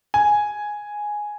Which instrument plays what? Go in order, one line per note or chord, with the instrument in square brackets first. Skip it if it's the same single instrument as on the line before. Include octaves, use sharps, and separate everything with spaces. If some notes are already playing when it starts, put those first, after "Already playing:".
[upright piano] G#5